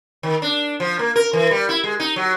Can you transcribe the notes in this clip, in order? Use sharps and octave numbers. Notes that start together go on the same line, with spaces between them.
D#3
D4
F3
A#3
A#4
E3
G3
E4
G#3
D#4
F#3